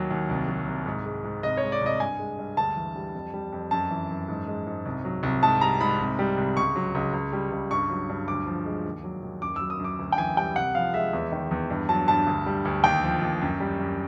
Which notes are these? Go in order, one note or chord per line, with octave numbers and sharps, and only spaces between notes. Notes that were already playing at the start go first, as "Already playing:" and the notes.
Already playing: D#2 F#3
D#2
C2
F#3
C2
G#2
G#3
G#2
C2 D#5
C#5
G#3
D5
C2 D#5
G2 G#5
G#3
G2
D2 A5
E3
G3
F2
G3
F2
F#2 A5
E3
F#2
G#2
G#3
G#2
C2
F#3
C2
G#2 A5
G3 A#5
G#2 B5
C2
G3
C2
C#2 C#6
F#3
C#2
C#2
G3
C#2
G2 C#6
F#3
G2
D2 D6
F3
G#3
D#2
F#3
D#2
F#2 D6
F#3 E6
D#6
F#2
D6
D2
G5
E3 G#5
G3 G5
C2 F#5
F3 F5
G#3 E5
E2
D#3
E2
G2
F#3 A5
G2 A5
D2
G3
D2
D#2 G5
F3
D#2
F#2
G3
F#2